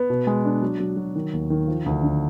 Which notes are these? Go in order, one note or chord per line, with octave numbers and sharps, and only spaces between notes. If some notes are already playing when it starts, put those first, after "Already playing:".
Already playing: B3
B2
G#3
D4
F#3
F#3
F#3
D#3
D#2
D#3
F3
D2
D3